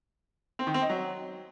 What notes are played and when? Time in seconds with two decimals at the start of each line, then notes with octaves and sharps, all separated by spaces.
0.59 C4
0.67 D#3
0.74 C4
0.82 D#4
0.90 F#3